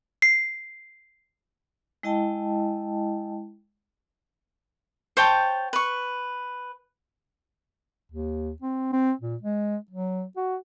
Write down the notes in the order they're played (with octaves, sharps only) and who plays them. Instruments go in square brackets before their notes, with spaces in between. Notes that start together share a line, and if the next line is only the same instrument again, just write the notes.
[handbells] C7
[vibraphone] G#3 E4 D#5 G5 A5
[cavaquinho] C5 C#5 G5 A5
B4 C#6
[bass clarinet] D#2
C4
C4
A#2
G#3
F#3
F#4